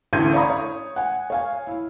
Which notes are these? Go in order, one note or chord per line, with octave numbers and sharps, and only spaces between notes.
A1 D2 A2 G6 G#6 D#7
C#5 D5 F5 A#5 B5 D#6
C#5
F#5 G#5
C#5 F5 G#5
E4